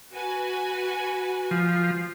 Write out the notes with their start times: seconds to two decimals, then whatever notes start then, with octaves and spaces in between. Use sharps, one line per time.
0.13 F#4 B4 G#5
1.51 F3